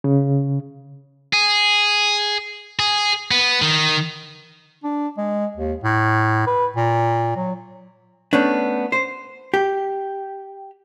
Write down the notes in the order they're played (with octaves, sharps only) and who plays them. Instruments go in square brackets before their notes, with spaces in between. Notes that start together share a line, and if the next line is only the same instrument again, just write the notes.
[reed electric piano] C#3
[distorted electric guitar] G#4
G#4
B3
D#3
[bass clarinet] D4
G#3
D#2
A2
B4
A#2
F#3
[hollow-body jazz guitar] A3 B3 C#4 D4
C5
G4